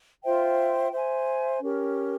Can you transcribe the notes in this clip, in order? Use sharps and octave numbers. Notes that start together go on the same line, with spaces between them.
F4 C5 E5 G5
C5 E5 G#5
C#4 G4 A#4